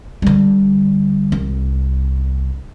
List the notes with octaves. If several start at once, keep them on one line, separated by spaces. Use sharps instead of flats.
D3 G3
C2